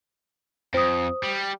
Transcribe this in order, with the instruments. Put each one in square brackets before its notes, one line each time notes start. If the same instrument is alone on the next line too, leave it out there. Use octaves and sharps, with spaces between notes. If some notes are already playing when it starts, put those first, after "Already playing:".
[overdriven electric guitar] F2 [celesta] C5 D#6
[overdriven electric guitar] G3